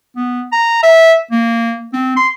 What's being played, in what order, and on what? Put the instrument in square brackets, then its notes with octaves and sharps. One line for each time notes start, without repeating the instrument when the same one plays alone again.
[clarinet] B3
A#5
E5
A#3
C4
C6